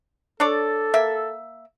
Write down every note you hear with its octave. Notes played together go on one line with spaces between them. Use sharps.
D4 A4 C#5 D5
A#3 E5